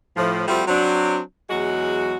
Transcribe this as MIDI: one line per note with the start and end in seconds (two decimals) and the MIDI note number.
0.17 0.43 45
0.17 0.43 53
0.48 0.64 53
0.48 0.64 55
0.48 0.64 57
0.48 0.64 60
0.48 0.64 65
0.48 0.64 66
0.68 1.19 54
0.68 1.19 60
0.68 1.19 62
1.50 2.16 40
1.50 2.16 54
1.50 2.16 56
1.50 2.16 66